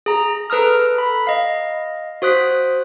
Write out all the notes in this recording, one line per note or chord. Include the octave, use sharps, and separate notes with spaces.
G#4 A#5
A4 B4 A#5 D#6 F6
B5
D#5 F5
F#4 C5 D#6 F#6 B6